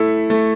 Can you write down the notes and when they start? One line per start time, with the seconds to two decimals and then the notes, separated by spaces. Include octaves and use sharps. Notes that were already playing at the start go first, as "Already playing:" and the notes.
Already playing: A3 E4 A4
0.30 A3